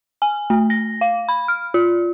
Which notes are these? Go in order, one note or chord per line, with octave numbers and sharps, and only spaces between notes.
G#5
A3
A#6
F5
B5
F6
F4